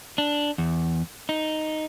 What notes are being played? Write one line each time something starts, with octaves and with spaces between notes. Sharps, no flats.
D4
E2
D#4